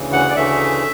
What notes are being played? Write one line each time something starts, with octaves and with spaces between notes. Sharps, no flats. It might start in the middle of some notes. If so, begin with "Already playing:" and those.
Already playing: D2 C#3 E3
F#5
D5
D2 C#3 E3 A3 E5